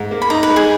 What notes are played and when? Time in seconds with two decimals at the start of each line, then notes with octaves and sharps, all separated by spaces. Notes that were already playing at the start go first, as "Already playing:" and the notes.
Already playing: G#2
0.11 A#3
0.22 B5
0.30 D#4 A#5
0.43 B4
0.50 G#3
0.56 G#4